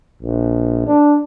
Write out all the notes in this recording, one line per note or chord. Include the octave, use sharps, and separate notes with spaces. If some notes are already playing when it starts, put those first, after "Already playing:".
A#1
D4